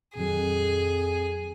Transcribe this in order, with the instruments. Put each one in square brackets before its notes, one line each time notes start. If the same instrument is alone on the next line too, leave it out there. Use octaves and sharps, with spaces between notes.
[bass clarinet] F2 [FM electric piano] A#2 D#3 F#3 [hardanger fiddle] G#4